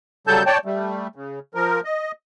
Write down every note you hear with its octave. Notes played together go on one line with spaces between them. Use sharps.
C#3 F#3 G3 A4 A5 G6
C#5 D5 G5 A5
G3 A3
C#3
F3 A#4
D#5